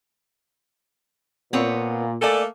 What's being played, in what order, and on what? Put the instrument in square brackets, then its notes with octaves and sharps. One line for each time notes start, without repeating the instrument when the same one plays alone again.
[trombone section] A#2 [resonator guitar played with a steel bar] B3 C4 C#5
[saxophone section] A3 A#3 A4 [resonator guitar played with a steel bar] D5 G#5